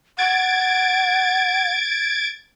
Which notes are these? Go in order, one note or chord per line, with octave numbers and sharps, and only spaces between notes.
F#5 G#6 A6 D7